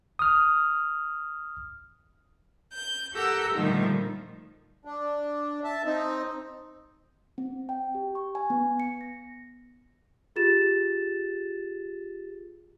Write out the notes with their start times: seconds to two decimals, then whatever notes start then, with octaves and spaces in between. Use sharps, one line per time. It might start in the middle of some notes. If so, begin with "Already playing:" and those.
0.19 D#6 F6
2.74 G6
3.14 G4 A4 A#4 F#5 E6 G6
3.53 A#2 D3 D#3 F3 G3 A3
4.85 D4
5.64 E5 A5
5.85 C4 D#4
7.38 C4
7.69 G5
7.95 G4
8.15 C#6
8.35 G#5
8.50 B3
8.80 C#7
9.01 A#6
10.36 F4 G4 G#4 A6 E7